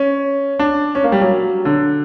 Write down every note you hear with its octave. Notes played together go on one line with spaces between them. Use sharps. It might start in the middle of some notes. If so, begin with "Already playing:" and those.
Already playing: C#4
D4
C#4
A#3
G3
F#3
D3